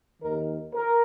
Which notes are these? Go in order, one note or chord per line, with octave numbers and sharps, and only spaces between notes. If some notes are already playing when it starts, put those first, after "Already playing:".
D#2 D#3 A#4
A#4